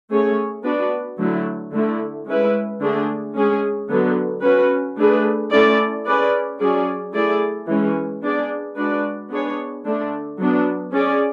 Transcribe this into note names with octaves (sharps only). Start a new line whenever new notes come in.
A3 C#4 G#4 C#5
B3 D4 F#4 B4 D5
D3 F#3 A3 E4
D3 A3 E4
G#3 C#4 E4 B4
D3 A3 D4 G#4
G#3 C#4 G#4
D3 F#3 B3
C#4 F#4 B4
A3 D4 G#4 B4
A3 C#4 E4 A4 D5
C#4 G#4 B4 D5
F#3 C#4 G#4 D5
A3 E4 G#4 D5
E3 G#3 C#4
B3 D4 G#4 D5
G#3 D4 F#4 B4 D5
B3 D4 G#4 C#5
D3 A3 D4
F#3 B3 D4
C#4 G#4 D5